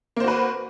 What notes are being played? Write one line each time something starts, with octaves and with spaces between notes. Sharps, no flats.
A#3 F#4 B4 C5